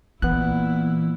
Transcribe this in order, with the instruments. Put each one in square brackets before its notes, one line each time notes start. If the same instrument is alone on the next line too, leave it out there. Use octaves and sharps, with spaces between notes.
[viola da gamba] A#2 E4 [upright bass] E3 [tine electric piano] B3 F#6